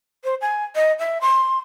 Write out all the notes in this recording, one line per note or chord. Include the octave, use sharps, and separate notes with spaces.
C5
G#5
D#5
E5
C6